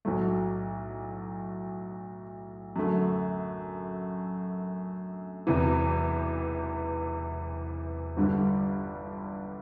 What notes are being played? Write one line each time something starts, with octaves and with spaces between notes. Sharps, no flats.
B1 A2 F#3 A3
F#2 D3 A3
E1 E2 C3 E3
G1 G2 D3 G3